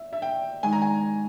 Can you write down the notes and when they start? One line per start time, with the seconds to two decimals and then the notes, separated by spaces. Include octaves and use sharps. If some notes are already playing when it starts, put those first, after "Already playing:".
Already playing: E5
0.13 E5
0.22 G5
0.63 D#3 G#3 G#5
0.73 A#5
0.82 G#5